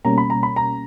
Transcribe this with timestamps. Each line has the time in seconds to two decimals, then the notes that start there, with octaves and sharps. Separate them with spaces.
0.05 B2 G3 A#3 C#4 A#5
0.18 B5
0.30 A#5
0.43 B5
0.56 A#5